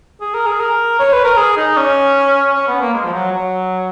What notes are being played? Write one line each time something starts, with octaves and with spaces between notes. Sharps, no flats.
G#4
A#4
G#4
A#4
C#5
B4
A#4
G#4
D#4
C#4
C#4
B3
A#3
G#3
F3
F#3
F#3